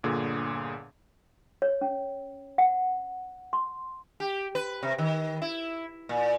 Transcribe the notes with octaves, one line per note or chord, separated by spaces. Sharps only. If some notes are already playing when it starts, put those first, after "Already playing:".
G1 A#2 D3 G#4
C#5
C#4
F#5
C6
G4
B4
C3
D#3
E4
A#2